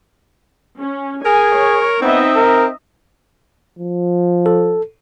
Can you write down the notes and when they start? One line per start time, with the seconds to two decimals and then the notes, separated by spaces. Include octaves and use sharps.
0.79 C#4
1.25 G#4 A#4 G#5
1.57 C#5
2.02 B3 C4 D#4 D#5 E5
2.35 A#4
3.79 F3
4.46 A4